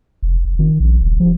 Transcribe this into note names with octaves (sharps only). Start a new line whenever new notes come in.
F1
F#1
D#3
A#1
D#1
F3